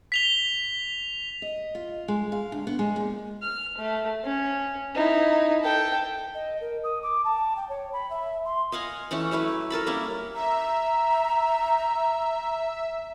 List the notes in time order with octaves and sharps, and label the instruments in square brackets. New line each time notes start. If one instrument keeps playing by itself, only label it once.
[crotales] B6 F7 G7
[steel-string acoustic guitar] D#5
F4
G#3
F5
D2
B3
G#3
A#2
[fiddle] F6
A3
C#4
D#4 E4
A4 G5
[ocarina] D#5
A#4
D#6
D6
A5
G5
C#5
B5
E5
C6
[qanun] D#5 F5 F#5 G#5
E3 A3 C#4 F#5
F#3 A3 E4 B4
A4 A#4 A5 B5
G3 A#3 C#4 E4
[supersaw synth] E5 [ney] A#5